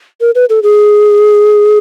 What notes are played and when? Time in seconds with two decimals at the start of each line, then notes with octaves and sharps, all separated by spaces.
0.21 A#4
0.35 B4
0.50 A4
0.63 G#4